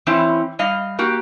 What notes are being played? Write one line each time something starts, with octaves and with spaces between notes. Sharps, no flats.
E3 C4 C#4 E4
G3 D#5 F5
A#3 F#4 G4